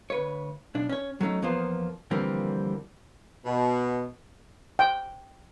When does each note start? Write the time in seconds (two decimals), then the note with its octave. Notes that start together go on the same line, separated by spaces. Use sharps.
0.10 D2 B4 C#5
0.75 B1 D4
0.89 C#4 C#5
1.21 F#3 A3 C#4 D#4
1.42 E2 F3 A#3 B3 F4 C5
2.11 D3 E3 F3 G3 A#3 C4
3.46 B2
4.79 G5